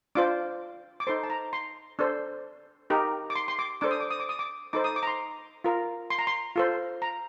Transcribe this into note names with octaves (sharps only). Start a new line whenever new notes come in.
D4 F4 C5 D6
D6
D#4 A4 C5 C6
A5
A#5
C6
D4 A4 C5
D#4 G4 A#4
D6
C6
C6
D6
D4 A4 C5 D6
D#6
D6
D#6
D6
D#6
D6
D#4 A4 C5 D6
D#6
D6
A#5
C6
F4 A#4
C6
A#5
C6
F4 A4 C5
A#5